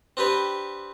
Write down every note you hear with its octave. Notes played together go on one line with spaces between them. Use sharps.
C4 D4 G4 B4